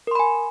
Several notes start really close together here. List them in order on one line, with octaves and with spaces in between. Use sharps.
A#4 C6 B5 G#5